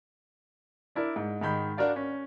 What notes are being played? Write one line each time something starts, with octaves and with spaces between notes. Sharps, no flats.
D4 E4 A#4 D5
G#2
G#2 D#3 B5 G6
D4 F#4 A#4 D5 F5
C#4